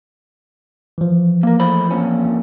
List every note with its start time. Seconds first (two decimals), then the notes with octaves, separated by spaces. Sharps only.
0.98 E3 F3
1.43 A#3 A#4
1.60 A2 C5 B5
1.90 F2 A#2 C#4